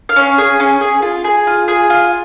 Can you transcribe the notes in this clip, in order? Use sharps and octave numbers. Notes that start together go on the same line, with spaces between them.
F5
C#4
G#4
C#4
G#4
F4
G#4
F4
G#4
F4